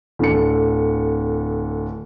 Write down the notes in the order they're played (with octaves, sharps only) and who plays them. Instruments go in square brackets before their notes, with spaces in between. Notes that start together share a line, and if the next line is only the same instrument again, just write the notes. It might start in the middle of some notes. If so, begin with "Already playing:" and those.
[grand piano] D1 D3 C#7